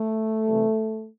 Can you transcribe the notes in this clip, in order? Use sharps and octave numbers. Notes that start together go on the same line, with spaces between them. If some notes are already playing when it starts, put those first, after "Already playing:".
Already playing: A3
C3 E3 G3